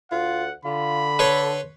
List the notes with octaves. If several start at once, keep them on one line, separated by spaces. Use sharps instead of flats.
D2 F4 F#5
D3 F4 B5
A4 B4 C#5 C6